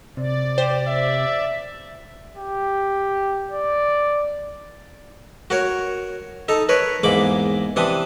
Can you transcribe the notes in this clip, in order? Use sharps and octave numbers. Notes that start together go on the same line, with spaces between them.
C3 D5
G4 C5
E5
G4
D5
F#4 A#4 C#5
D#4 A4 A#5
A#4 B4 C#5
E2 G#2 A#3 B5 D6
C3 E3 D4 D#6